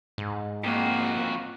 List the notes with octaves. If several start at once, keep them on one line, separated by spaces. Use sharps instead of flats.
G#2
F2 A#3 C4 F#4